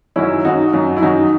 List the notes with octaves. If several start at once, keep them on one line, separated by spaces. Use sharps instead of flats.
F#2 D#3 F#3 C#4 E4
F#2 D#3 F#3 D#4 F#4
F#2 D#3 F#3
E4
F#2 D#3 F#3 D#4 F#4